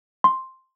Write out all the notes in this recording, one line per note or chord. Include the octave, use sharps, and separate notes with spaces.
C6